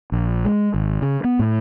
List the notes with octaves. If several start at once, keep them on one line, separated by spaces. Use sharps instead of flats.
A#1
G#3
G#1
C#3
B3
A2